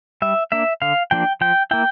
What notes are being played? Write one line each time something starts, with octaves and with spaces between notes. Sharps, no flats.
G3 E5
A#3 D4 E5
D3 F5
F3 A#3 D4 G5
F3 G5
A#3 E4 G5